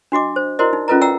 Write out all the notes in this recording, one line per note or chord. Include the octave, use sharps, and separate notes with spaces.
D4 F#4 D#5 D6
C5
E4 F#4 A#4 C5 D5 D#5
D#4
C#4 F4 A4 B4 D#5 A#5
D5 E5 F#5 G5 A#5 E6